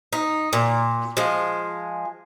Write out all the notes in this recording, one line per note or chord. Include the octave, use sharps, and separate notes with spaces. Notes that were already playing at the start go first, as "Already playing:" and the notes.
D#4
A#2
F3 G#3